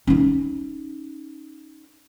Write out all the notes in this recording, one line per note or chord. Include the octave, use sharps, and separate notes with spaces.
C#4 D#4